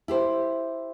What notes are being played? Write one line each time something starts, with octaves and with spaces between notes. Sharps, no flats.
E4 G4 C5